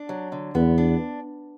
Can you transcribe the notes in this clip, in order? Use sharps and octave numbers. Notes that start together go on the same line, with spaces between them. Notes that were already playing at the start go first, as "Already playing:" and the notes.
Already playing: D4
F#3
D3
E2 B3
D4